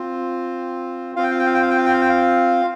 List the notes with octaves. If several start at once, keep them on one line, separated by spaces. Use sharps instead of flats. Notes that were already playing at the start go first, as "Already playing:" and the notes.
Already playing: C4 F4
C4 F4 F5
G5
F5
G5
F5
G5
F5
G5
F5
G5
F5
G5
F5